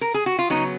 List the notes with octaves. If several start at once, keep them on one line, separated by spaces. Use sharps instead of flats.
A#4
G#4
F#4
F4
C#3 F#3 B3 D#4